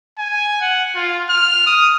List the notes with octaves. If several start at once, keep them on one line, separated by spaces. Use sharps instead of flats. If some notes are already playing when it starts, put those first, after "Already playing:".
G#5
F#5
F4
F6
D#6